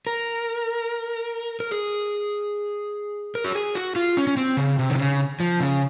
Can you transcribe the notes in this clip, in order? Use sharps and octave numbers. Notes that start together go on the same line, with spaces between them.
A#4
A#4
G#4
A#4
F#4
G#4
F#4
F4
C#4
C#4
C4
C#3
C3
D#3
C#3
F3
C#3